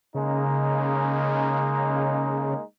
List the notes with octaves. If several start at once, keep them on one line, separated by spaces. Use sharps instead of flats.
C#3 G#3 A#3 D#4